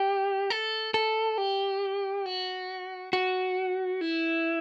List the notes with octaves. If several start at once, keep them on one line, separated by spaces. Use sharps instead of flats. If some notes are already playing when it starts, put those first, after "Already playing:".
Already playing: G4
A4
A4
G4
F#4
F#4
E4